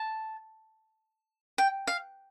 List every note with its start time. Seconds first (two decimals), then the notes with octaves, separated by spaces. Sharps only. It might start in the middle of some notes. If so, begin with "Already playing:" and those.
Already playing: A5
1.58 G5
1.87 F5